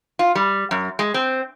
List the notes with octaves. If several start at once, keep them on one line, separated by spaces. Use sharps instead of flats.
F4
G3
F#2
G#3
C4